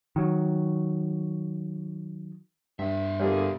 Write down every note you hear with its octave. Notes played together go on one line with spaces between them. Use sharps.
D#3 F#3
G2 B2 E5
G1 G3 A#3 G#4